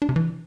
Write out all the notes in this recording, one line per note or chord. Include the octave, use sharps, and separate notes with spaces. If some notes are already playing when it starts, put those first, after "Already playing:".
D4
C3
E3